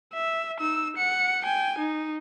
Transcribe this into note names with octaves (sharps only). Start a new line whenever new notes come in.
E5
D#4 E6
F#5 C#7
G5 G#5
D#4